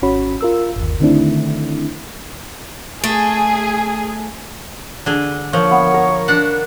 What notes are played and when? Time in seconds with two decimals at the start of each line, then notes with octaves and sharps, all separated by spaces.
0.02 G#1 C#4 F#4 C#5 B5
0.41 F4 A#4 E6
0.76 G1 D#2
1.00 D3 D#3 A3 C4 D4 E4
3.04 A3 G#4
5.06 D3 G#4
5.53 F3 A#3 C#5
5.71 B3
5.94 A#4
6.28 D4 F#5